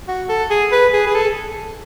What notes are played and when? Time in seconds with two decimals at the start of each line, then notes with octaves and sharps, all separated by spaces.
0.08 F#4
0.29 A4
0.50 G#4
0.72 B4
0.93 G#4
1.07 G#4
1.14 A4